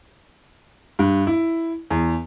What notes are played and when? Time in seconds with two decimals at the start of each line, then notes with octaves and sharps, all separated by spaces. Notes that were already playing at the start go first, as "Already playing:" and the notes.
0.99 G2
1.27 E4
1.90 E2